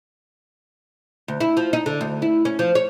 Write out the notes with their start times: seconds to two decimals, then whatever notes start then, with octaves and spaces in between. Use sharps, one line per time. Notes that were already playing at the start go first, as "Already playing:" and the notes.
1.28 D2
1.40 E4
1.57 F3
1.73 D#4
1.86 D3
2.01 D2
2.22 E4
2.45 C#4
2.59 F3
2.75 C#5